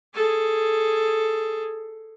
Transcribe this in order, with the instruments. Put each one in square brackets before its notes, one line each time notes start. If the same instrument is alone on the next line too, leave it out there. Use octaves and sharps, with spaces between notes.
[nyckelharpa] G#4 A4